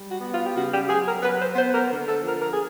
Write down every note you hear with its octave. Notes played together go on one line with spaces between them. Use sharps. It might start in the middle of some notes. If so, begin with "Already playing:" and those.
Already playing: G3
F#4
B3
F4
G4
C#3 F#4
G4
F#3 G#4
A#4
F#3 B4
C5
B3 C5
A#4
D3
A4
F3 A#4
A#4
G#4